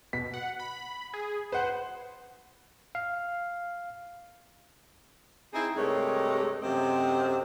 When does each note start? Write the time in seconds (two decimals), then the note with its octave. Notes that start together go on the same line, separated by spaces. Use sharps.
0.13 B2 B6
0.34 F#5
0.60 B5
1.14 G#4
1.52 B4 C5 F#5
2.95 F5
5.53 C4 D#4 E4 G#4
5.76 G2 C3 G#3 A3 A#4 C#5
6.61 F#2 C3 A3 C4 C5 D#5